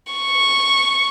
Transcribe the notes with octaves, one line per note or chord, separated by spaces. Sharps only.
C#6